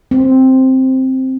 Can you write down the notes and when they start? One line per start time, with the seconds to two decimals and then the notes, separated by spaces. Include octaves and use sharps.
0.11 C4